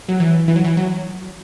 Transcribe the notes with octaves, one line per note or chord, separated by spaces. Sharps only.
F#3
E3
E3
F#3
E3
F#3